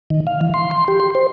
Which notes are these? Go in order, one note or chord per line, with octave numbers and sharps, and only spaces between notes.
D#3
F5
E3
C6
C6
G4
C6
C5